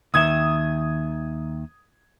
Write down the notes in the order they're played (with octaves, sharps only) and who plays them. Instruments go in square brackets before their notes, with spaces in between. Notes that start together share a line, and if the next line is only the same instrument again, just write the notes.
[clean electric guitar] D#2 D#3 E5 [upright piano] D#6 G#6